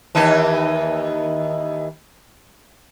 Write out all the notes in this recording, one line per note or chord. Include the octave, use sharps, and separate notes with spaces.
D#2 E3 D#4